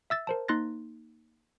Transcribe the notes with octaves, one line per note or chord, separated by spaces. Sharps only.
E5 E6 A6
A#4 C5 A5
A#3 D#4 C6 F#6 A6 A#6